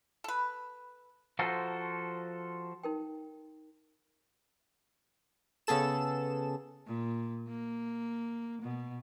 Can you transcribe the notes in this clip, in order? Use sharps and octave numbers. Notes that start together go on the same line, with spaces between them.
A4 B4
F3 F#4 A4 A#4 C5
D#4 A#4 G5
C#3 B3 G#4 A4 E7
A#2
A#3
B2